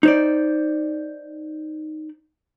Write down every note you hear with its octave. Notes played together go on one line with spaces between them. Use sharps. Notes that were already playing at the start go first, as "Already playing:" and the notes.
D#4 C5 D5